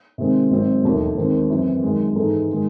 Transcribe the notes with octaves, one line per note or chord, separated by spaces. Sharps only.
C3 D#3 G#3 C4
G#1 G#2 F#3 C4
E1 D#2 D#3 F#3 A3
D#2 D#3 G#3 C4
F#2 E3 C4
F#2 D#3 G#3
G#2 E3 G#3 D#4 A4
D#3 G#3